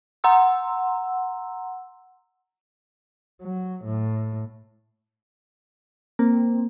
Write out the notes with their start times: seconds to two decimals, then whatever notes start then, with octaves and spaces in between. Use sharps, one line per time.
0.24 F#5 A#5 C6 E6
3.41 F#3
3.84 A2
6.19 A#3 C4